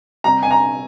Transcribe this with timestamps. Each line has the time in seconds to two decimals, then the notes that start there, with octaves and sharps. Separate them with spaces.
0.24 C3 G3 A#5
0.43 G#5
0.51 A#5